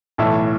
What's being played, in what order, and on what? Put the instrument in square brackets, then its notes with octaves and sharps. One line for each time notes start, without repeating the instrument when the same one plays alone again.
[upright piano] B1 A2 E3 A3 E5